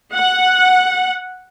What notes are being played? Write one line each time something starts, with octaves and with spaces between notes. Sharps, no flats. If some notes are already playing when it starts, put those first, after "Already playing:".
F#5